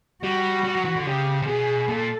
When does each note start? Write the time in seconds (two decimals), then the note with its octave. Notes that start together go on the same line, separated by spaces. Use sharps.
0.23 G3 F#4
0.65 G3
0.75 F#3
0.85 E3
0.96 D3
1.06 C#3 G4
1.42 C3
1.47 B2 G#4
1.89 A#2 A4